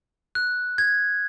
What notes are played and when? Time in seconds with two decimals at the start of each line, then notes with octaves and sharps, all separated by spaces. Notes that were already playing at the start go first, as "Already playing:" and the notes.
0.35 F#6
0.78 G#6